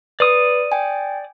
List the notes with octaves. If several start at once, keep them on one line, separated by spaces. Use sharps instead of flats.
B4 D5 D#6
G5 G#5